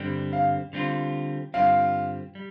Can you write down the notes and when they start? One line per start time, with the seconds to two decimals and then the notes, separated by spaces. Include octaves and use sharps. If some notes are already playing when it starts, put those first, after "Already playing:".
Already playing: G2 D3 G3 C4
0.33 F5
0.73 D3 G3 C4 F4
1.54 G2 D3 G3 C4 F4 F5
2.35 G3